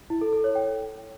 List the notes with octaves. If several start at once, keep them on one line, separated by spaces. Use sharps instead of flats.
E4
A4
A4
C#5
G5